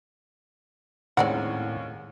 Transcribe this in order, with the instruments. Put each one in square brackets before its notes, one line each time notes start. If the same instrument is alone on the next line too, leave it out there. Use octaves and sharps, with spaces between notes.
[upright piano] D#2 G#3 C#4 [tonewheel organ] A2 [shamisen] C4 D5 F#5